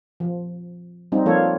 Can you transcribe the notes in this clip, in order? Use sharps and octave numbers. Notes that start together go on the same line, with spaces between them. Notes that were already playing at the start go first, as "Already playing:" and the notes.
F3
G3 C4 D#4
F3 A#3 F4 A4 C#5